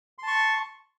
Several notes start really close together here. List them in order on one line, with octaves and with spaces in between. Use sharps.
C6 A5 C#6